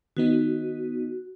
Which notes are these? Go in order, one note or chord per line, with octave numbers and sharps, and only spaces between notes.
D#3 B3 D#4 F#4